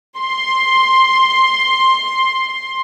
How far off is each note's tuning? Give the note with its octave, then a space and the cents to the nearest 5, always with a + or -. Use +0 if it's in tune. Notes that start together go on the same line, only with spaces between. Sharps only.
C6 +5